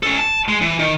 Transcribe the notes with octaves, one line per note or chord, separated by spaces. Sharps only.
C#4 A4
A5
G#3
E3
D#3